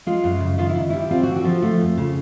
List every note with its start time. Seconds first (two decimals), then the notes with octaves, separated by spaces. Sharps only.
0.07 G#3 F4
0.24 F#2
0.40 C#3
0.58 D#3 F4
0.69 E4
0.76 D#3
0.90 G3 E4
1.10 C4 F4
1.23 D3 F#4
1.36 F#4
1.45 F3 F4
1.62 A3 F4
1.80 F2
1.97 C#3